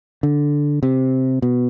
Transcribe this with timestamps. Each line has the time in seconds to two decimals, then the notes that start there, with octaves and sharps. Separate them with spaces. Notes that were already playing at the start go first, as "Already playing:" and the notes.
0.23 D3
0.83 C3
1.42 B2